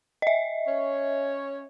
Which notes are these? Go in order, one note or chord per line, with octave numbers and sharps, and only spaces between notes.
D#5 E5
C#4 C#5